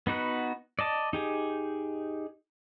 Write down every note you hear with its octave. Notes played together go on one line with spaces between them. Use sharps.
B3 D#4 F#4 B4
D5 D#5 A5
D#4 G4 G#4